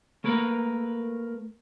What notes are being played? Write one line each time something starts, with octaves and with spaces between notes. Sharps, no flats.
A3 A#3 A#4 B4